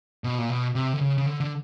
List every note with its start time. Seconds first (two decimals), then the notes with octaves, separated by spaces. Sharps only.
0.24 B2
0.38 A#2
0.49 B2
0.75 C3
0.94 D3
1.01 C#3
1.18 C#3
1.26 D3
1.40 D3